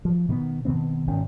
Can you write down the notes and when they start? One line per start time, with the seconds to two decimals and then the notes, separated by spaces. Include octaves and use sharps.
0.05 F3
0.28 B2 D#3 B3
0.65 B2 D#3 B3 C4
1.07 G#1 B2 D#3 C#4